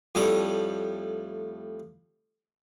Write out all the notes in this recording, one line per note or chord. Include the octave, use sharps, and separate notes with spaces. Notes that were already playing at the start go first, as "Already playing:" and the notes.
F2 A2 G3 A4 D#6